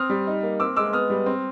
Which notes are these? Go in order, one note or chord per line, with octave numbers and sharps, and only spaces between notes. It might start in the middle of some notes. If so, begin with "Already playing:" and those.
Already playing: C4 D#6 F6
G3
D#4
A#3
C4 D6 E6
G#3 D6 E6
B3 D#6 F6
G3
C4